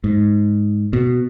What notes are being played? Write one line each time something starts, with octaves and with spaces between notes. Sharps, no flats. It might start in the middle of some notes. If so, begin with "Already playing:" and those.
G#2
B2